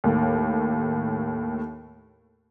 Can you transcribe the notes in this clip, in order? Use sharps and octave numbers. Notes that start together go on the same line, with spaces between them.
D#2 A2